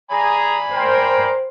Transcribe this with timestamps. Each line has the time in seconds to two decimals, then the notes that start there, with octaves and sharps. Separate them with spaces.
0.11 G#4 D5 G#5 A#5 B5
0.73 A#4 C5 G5